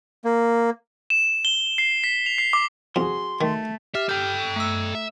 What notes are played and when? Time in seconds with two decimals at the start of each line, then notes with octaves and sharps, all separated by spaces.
0.25 A#3
1.10 E7
1.45 G7
1.78 C7
2.04 B6
2.26 F7
2.38 C7
2.53 D6
2.96 F2 F#4 G#4 C6
3.41 D#3 A3
3.95 G4 E5 F6
4.09 A4 G5 G6
4.56 A3 E6
4.95 E5